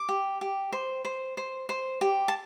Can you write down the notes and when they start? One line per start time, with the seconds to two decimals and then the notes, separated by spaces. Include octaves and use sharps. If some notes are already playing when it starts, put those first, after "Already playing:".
Already playing: D6
0.09 G4
0.41 G4
0.72 C5
1.05 C5
1.37 C5
1.69 C5
2.01 G4
2.28 A5